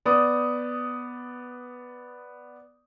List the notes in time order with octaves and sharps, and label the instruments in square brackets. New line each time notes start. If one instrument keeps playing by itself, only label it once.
[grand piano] B3 D5 D#6